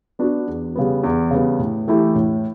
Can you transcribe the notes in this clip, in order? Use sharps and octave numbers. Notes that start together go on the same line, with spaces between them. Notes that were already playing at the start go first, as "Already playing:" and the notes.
B3 D4 F#4
E2
C#3 G3 B3
E2
C#3 G3 B3
A2
E3 A3 E4 G4
A2